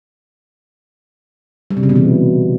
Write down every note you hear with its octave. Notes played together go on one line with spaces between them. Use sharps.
G3
C3
C#3
B2
E3